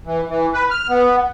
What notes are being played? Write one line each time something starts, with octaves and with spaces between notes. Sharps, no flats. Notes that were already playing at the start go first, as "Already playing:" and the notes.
E3
E3
B4
F6
B3